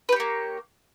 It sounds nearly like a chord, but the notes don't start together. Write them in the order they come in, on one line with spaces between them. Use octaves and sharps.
B4 G4 C#5 A#3